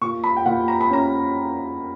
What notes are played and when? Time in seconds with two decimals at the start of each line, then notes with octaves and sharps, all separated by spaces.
0.01 A#2 C#6
0.24 B5
0.37 G5
0.46 A#2 F#5
0.68 A#5
0.81 B5
0.90 C#4 A#5